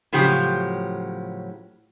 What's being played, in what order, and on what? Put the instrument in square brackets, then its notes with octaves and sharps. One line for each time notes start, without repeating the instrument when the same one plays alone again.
[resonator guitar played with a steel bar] A2 C#3 F3 F#3 G4